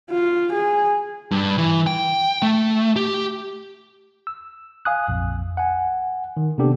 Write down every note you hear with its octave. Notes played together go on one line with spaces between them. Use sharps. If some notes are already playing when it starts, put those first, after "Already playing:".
F4
G#4
G2
E3
G5
A3
G4
E6
F5 G#5 D#6 F#6
A#1 F2
F#5 G#5
D#3
C3 A#3 B3 D4 G4 A4